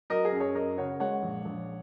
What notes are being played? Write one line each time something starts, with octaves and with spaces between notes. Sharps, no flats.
F#3 A#4 D#5
G#4
F#2
G#4 C#5
F#2 A#4 D#5
C#3 C#5 F#5
G#3 C#5 F#5
A#1
A#1